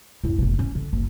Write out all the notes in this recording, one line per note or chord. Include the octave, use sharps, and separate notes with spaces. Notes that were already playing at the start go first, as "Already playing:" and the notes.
F#2 E4
F1 B2
C#4
D3
F#1